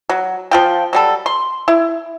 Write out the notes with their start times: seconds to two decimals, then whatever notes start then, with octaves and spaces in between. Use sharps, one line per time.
0.09 F#3
0.51 F3 F4 G5
0.93 F#3 G3 A4
1.26 C6
1.68 E4